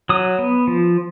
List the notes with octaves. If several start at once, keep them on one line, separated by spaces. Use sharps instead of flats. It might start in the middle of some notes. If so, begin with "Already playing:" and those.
F#3 D#6
B3
F3